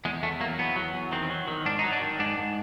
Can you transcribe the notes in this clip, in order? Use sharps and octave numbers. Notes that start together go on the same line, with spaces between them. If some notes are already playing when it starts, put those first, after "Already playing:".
E2 G#3
E2 A3
F#3 A#3
E2 B3
F#3
E2
D#3 C4
F#3
D#3
G#2 D4
F#3 D#4
D4
D#3
G#2 D4
G#2